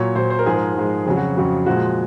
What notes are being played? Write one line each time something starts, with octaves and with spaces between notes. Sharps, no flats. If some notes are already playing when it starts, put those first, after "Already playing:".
Already playing: A#2 F#3 C#5
A#2 F#3 C5
C5
A#4
G#2 F3 G#3 G#4
A#4
G#2 F3 G#3
F2 C#3 F#3 G#4
F#4
F2 C#3 F#3
A#2 F3 G#3 F#4